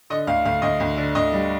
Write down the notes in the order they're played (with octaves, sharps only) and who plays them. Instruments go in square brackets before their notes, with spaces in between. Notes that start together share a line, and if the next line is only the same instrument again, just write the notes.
[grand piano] D3 D#5
D2 F5
D2 F5
D2 D#5
D2
D3
D2 D#5
G3